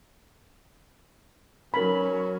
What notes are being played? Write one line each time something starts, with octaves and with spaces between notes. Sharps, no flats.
F#3 C#4 A#4 B5